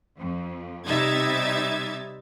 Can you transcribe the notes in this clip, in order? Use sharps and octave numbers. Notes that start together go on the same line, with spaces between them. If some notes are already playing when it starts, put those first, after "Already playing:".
F2
C3 G3 D#4 E5 G#6 A6